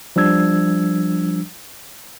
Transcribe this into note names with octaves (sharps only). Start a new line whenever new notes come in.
F3 G3 D4 E6 G#6